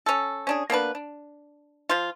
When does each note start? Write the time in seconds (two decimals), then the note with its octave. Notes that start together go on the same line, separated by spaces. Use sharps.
0.06 C#4 A4
0.47 C#4 D4 G#4
0.70 A#3 B3 D4 B4
0.95 D4
1.89 F3 F4